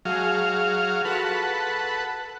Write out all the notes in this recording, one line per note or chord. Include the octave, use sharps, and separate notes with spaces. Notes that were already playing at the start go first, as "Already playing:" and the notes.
F#3 G#3 G#4 F5
F4 F#4 A4 B4 F#5